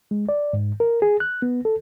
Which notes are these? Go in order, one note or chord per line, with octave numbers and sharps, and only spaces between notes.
G#3
D5
G#2
A#4
G#4
F#6
B3
A4